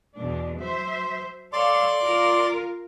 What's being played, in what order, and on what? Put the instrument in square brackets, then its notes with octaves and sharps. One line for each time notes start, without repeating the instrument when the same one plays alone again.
[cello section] E2 B2 D4
F#3 C5 E5
[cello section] A4 C#5 F5 [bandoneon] D5 C6 D6
[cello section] F4 A#4